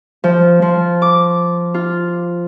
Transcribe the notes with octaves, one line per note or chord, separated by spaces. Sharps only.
F3
F3
D6
F4